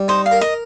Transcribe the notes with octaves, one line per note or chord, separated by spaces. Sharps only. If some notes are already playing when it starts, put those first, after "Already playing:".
Already playing: G3
D#4 C5
F5
A#4
D#5